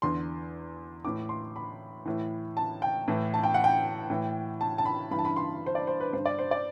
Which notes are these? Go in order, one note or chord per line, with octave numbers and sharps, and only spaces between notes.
E2 D3 C6
A2 E3 D6
C6
B5
A2 E3
A5
G5
A2 E3
A5
G5
F#5
G5
A2 E3
A5
A5
B5
G2 E3 B5
A5
B5
C6
C5
D5
C5
B4
G2 D3 C5
D5
C5
D5